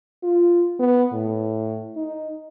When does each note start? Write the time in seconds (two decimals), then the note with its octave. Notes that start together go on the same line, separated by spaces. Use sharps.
0.23 F4
0.79 B3
1.13 A2
1.96 D#4